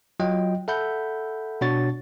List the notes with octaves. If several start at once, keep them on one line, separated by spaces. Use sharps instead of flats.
F#3 F4 D#5 G5
A4 E5 F#5 B5 G6
B2 D4 F#4 C#5 A6